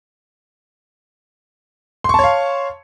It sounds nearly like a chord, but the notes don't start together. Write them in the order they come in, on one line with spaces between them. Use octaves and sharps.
C6 C#6 A5 C#5 F5